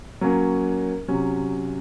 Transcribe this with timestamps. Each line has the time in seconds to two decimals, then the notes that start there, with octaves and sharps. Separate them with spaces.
0.21 F#3 A#3 C#4
1.08 C3 F#3 C#4